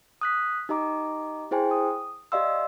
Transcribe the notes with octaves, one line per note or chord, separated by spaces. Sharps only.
D#6 F#6 B6
D#4 G4 D#5 A#5 D6
E4 G#4 C5 G5 G#5 C6
D#6
G4 D5 D#5 F5 C6 E6